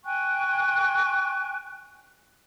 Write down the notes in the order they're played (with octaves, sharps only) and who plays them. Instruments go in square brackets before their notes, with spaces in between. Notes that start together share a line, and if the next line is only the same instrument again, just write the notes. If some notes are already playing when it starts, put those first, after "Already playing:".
[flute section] G5 G#5 C#6 F#6